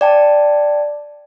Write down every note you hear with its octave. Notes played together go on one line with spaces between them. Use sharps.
D5 G5 A5